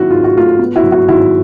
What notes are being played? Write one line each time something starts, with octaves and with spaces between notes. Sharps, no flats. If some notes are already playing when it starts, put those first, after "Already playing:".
Already playing: C3 D#3 F#3 E4 F#4
G#2 F4
F#4
A3 F4
B3
E4 F#4
F#3
E4 F#4
D#3 E4 F#4